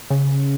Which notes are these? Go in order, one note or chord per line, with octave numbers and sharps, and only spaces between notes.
C#3